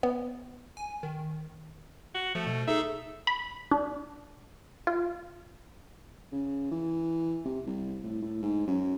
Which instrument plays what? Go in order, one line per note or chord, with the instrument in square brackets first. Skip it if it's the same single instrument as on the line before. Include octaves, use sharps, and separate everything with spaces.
[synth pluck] B3
[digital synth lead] G#5
D#3
[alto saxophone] F#4
[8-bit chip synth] F3 [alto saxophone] A3
[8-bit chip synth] B2
[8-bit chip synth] D#4 G#4 A4 [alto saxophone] E5
[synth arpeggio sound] B5
D4
F4
[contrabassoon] C#3
E3
C3
C2
A2
A2
G#2
F#2